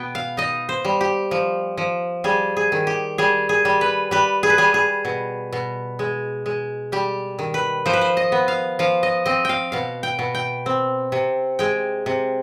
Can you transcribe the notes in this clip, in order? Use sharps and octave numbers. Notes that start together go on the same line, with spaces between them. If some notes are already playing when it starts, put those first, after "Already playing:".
Already playing: B2 B3 G5
F5
D#4 D#5
C5
G3
G4
F3
F3
G3 G#4
G#4
D#3
G4
G3 G#4
G#4
G3
B4
G3 B4
G#4
B4
G3 G#4
G#4
B2
B2
G#3
G#3
G3 G4
D#3
B4
F3 C5
B4
C5
D#5
B3
F5
F3 F5
D#5
C4 D#5
F5 G5
B2 F5
G5
B2
G5
C4
C3
G#3 G5
C3